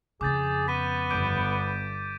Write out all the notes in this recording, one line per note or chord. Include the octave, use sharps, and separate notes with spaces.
F2 C#3 G#4 D6 G6 A6
B3 B6 D#7
G1 D6 G6 D7